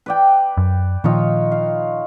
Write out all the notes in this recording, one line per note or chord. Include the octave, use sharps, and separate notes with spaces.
B4 D5 G5
F#2
A#2 D#3 F3 D#4 F4 C#5
F5